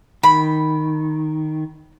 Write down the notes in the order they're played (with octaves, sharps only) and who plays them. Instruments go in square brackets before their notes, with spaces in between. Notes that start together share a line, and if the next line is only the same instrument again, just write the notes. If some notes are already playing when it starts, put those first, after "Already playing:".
[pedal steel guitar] D#3 [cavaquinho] B5